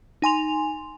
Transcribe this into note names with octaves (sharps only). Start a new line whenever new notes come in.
D#4 G#5 C6 F7